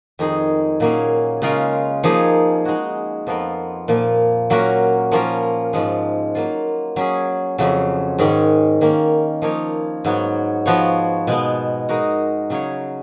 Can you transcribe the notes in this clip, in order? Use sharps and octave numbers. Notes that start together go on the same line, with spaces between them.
F2 D#3 G#3 D#4 G#4
A#2 F#3 A#3 C#4 G#4
C#3 G#3 C#4 F4 A#4
F3 A#3 D#4 G#4
G#3 D#4 F#4
F2 F3 B3 F4 A#4
A#2 F3 A#3
F#3 A#3 C#4 F#4 A#4
F3 A#3 C#4 F4 A#4
G#2 F3 G#3
F#3 A#3 F4
F#3 C#4 G#4
F2 C#3 F#3
G#2 D#3 G#3 C#4
D#3 A#3 C#4
F3 A#3 D#4 A#4 C#5
G#2 F#3 B3 F#4 C#5
F3 B3 F#4 C#5
B2 G#3 B3
G#3 D#4 F#4 A#4
C#3 F#3 C#4 G#4 C#5